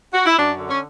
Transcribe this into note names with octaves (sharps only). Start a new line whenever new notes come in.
F#4
E4
F#2 D4
D3
C#4